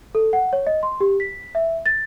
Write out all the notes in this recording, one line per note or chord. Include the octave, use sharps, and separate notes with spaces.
A4
F#5
C#5
D#5
C6
G4
B6
E5
A6